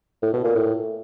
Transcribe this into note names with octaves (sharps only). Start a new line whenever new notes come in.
A2
B2
A#2
A2